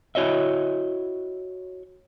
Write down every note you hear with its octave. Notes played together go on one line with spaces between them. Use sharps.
E4 F#4 C#5 D#5 E5